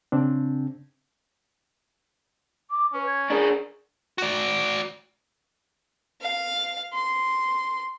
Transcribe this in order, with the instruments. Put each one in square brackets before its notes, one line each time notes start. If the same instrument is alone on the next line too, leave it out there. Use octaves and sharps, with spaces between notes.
[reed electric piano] C#3 C4 D4
[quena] D6
[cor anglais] C#4 [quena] B4
[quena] G#6
[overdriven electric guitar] D4 A#4 [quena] G#4
[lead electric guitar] F#4 D5
[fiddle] F5
C6